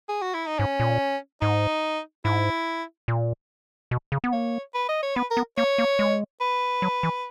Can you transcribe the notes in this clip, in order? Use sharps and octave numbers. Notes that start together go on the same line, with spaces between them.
G#4
F#4
E4
D#4
G#2 C#4
A#2
G#2 D#4
G#2 E4
A#2
B2
C#3
B3
A#3 C#5
B4
D#5
C#5
B3 B4
A#4
B3
A#3 C#5
A#3
G#3
B4
F#3
E3